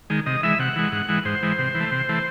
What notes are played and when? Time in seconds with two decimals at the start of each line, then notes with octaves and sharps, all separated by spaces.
0.10 D#3 G#3
0.26 C3 D#5
0.43 E3 G#3 E5
0.59 C3 F#5
0.76 E3 G#3
0.92 G#2
1.08 E3 G#3
1.25 G#2 C5
1.43 E3 G#3
1.59 C3
1.75 E3
1.80 A3
1.92 C3
2.09 E3 A3